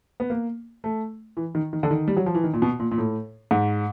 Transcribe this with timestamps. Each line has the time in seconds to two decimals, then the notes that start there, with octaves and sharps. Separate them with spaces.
0.20 B3
0.30 A#3
0.84 A3
1.37 E3
1.55 D#3
1.73 D#3
1.83 D3
1.91 D#3
2.08 G3
2.17 F#3
2.26 F3
2.35 E3
2.44 D#3
2.53 A#2
2.62 B2
2.80 A#2
2.91 A#2
2.98 A2
3.51 G#2